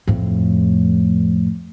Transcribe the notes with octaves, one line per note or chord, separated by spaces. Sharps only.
F2 A2